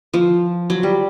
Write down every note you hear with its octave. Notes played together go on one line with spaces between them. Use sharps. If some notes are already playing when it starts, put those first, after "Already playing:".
F3
F#3
G3